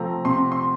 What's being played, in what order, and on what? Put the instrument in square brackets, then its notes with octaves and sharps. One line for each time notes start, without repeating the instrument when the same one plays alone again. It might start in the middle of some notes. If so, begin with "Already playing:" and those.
Already playing: [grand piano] C3 F3 A3 C4 A#5
C3 C6
C6